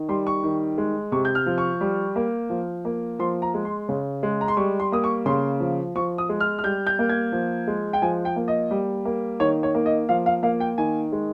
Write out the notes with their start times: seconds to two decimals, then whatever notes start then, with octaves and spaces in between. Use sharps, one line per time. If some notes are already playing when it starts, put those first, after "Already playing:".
Already playing: D#3
0.09 G3 C6
0.27 C#6
0.43 D#3
0.78 G#3
1.12 C3 C#6
1.25 G6
1.35 F6
1.46 F3
1.58 C#6
1.81 G3
2.16 A#3
2.50 F3
2.85 A#3
3.19 F3 C6
3.42 A#5
3.54 G#3
3.65 C6
3.89 C#3
4.23 G#3
4.41 A#5
4.48 C6
4.57 G3 C#6
4.80 C6
4.92 A#3 D#6
5.04 C#6
5.26 C#3 C6
5.60 F3
5.95 F3 C#6
6.18 D#6
6.29 G#3
6.40 F6
6.59 F6
6.64 G3 G6
6.87 G6
6.99 A#3
7.09 G#6
7.32 F3
7.67 G#3
7.93 G5
8.02 F3 G#5
8.25 G5
8.36 A#3
8.48 D#5
8.71 G3
9.05 A#3
9.40 D#3 C#5
9.63 C#5
9.75 A#3
9.86 D#5
10.09 F3 F5
10.26 F5
10.43 A#3 F5
10.60 G5
10.78 D#3 G#5
11.12 G#3